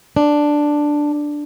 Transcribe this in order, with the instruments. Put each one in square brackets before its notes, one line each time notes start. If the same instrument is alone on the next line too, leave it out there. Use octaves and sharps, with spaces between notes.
[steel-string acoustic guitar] D4